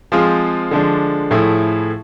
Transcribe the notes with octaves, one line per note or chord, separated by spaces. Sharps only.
F3 G#3 C4 F4 G#4
D3 F3 G#3 D4
A2 F3 A3 E4 G#4